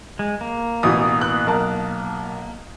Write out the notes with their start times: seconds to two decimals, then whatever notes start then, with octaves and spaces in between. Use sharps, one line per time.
0.19 G#3
0.41 A#3
0.83 A1 B2 E3 D#6
1.21 F#6
1.47 B1 A#4 A5